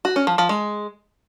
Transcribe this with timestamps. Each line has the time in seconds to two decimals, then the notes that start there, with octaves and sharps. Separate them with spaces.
0.05 F#4
0.16 C#4
0.27 F3
0.38 F3
0.49 G#3